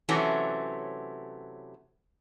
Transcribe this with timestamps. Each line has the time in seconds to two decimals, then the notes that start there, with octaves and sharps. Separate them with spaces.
0.09 C3 E3 F#3 A3 C#4